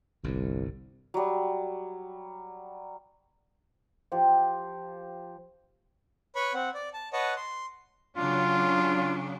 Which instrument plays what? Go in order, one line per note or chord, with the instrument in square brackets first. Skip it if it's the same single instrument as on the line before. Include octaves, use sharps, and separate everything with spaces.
[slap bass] G1 G2 [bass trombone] C2
[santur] F#3 G3
[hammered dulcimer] F3 G4 C5
[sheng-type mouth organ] B4 C#5 B5 C#6
C4 F#5
D5
A5
B4 C#5 D#5 F#5 A5
C6
[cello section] C#3 F#3 D4 [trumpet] F4